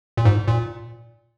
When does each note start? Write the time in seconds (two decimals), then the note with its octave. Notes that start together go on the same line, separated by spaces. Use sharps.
0.17 A#2
0.25 G#2
0.48 A#2